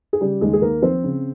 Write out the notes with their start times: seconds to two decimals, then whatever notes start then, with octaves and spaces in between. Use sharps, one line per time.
0.13 G#4
0.21 C#3 G3 G4
0.41 D#2 G#3 G#4
0.53 G#4
0.61 D#2 A#3 A#4
0.82 F3 C4 C5
1.03 C#3